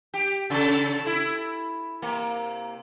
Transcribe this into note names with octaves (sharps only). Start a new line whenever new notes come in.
G4
C#3 A4
E4
C3 A#3